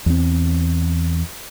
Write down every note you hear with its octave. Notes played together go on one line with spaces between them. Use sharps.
E2 C4